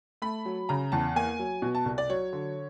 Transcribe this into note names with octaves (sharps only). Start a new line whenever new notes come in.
A3 B5
F#3
C#3 A#5
E2 A5
A#3 G#5
F#3
B2
A5
C2
D5
F#3 C#5
D3